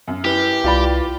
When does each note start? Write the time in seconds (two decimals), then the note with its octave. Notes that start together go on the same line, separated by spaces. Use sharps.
0.08 F#2
0.25 E4 G4 B4
0.64 C2 F4 D5 B5